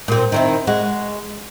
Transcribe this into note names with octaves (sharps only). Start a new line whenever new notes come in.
A#2 C4
D#3 C4 E4
G#3 F#4